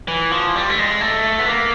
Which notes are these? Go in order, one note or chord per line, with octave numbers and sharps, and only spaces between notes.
E3
F3
G3
A3
G#3
A3
B3
A#3